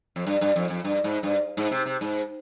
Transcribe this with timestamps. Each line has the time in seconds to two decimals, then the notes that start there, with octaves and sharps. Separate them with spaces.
0.16 F2
0.27 G2
0.41 G2
0.56 F2
0.70 F2
0.84 G2
1.04 G#2
1.23 G2
1.57 G#2
1.71 C3
1.86 C3
2.01 G#2